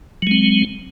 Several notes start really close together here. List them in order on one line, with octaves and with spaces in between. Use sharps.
F#3 G#3 C4